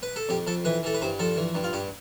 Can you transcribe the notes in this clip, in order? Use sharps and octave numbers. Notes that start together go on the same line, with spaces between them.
B4
A4
F2 G4
F2 A4
E3 B4
E3 A4
B4
G2 C5
F3 A4
E3
G2
F4
G2 G4